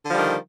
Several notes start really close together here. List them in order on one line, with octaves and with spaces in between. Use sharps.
D3 F3 G3 D#3